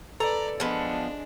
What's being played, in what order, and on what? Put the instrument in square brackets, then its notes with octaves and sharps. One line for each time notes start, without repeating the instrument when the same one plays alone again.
[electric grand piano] A4 [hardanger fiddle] B4 D5 [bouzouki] A#5
[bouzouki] F3 B3 [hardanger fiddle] G#3 D4